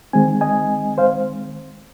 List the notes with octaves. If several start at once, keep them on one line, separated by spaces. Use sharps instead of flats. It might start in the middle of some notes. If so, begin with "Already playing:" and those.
D#3 G#3 C4 G#5
D#5 G#5
C5 F5